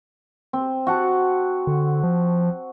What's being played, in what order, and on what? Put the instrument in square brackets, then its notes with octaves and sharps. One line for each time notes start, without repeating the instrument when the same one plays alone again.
[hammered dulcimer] C4
F#4 F#5 A5
[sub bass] D3
F3